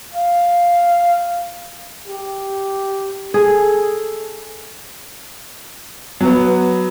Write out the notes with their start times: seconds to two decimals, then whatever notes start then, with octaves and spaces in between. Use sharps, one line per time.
0.13 F5
2.08 G4
3.34 G#4 A4
6.21 F#3 B3